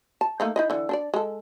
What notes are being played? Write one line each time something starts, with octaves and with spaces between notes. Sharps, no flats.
A5
A3 A#3 D#4
D#4 E4 D#5
D3 E3
D4 A4 D5
G#3 A4